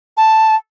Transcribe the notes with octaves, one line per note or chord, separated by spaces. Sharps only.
A5